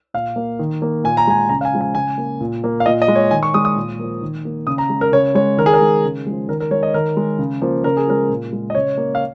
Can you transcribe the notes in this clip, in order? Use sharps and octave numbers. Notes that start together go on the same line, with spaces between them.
A#2 F5
A#3
D#3
A#3
A#2 G#5
A#5
G#3 G#5
C#3 A#5
F5
G#5
F3 G#3
G#5
C#3 G#5
A#3
A#2
A#3
F5
A#2 D#5
D#5
G#3
C#5
D#3 G#5
C#6
G#3 D#6
D#6
A#2
F3 A#3
D#3
A#3
C#3 D#6
A#5
G#3
A#4
C#3 C#5
G#3 C#5
D#3 A#4
G#4
A#4
G#3
C#3
F3 G#3
D#3 A#4
A#4
G#3 C#5
D#5
D#3 A#4
G#3
C#3
F3 A#3
C#3 A#4
G#4
F3 G#3 A#4
A#2
G#3
D#5
C#3 C#5
A#3
F5